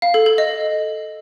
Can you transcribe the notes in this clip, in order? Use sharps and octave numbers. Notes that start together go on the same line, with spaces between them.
F5
A4
A4
D#5